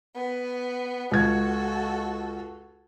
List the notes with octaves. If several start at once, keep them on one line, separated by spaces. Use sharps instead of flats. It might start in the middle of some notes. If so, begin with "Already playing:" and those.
B3
C#2 F#4 A4 G#6